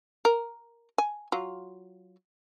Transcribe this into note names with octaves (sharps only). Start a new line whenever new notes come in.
A#4
G#5
F#3 F4